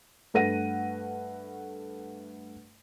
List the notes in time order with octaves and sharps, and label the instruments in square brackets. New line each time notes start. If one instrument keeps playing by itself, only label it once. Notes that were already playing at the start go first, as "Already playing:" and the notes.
[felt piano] G2 A3 B4 F#5 A#6 D#7